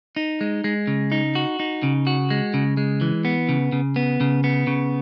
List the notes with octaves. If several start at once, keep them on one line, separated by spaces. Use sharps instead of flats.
D#4
G#3
G#3
C#3
D#4
F#4
D#4
C#3
F#4
G#3
C#3
G#3
E3
B3
C#3
C#3
B3
C#3
B3
C#3